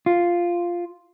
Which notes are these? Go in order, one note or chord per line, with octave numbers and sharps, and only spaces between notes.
F4